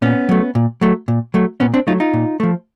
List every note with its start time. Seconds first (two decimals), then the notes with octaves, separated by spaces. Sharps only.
0.02 A#2 B3 C#4
0.29 F#3 A3
0.55 A#2
0.81 F#3 A3
1.08 A#2
1.34 F#3 A3
1.60 A#2 B3 C#4
1.74 C4 D4
1.87 F#3 A3 D#4 F4
2.00 D#4 F4
2.13 A#2
2.40 F3 A3